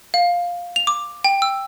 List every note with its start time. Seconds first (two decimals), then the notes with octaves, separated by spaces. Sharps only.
0.14 F5
0.76 F7
0.87 D6
1.24 G5
1.42 E6